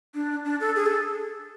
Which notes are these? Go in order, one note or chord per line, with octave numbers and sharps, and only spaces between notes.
D4
D4
A4
G#4
A4